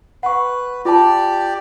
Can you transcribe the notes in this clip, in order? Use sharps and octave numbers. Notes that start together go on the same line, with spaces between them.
B4 F#5 C#6
F4 G4 D5 A5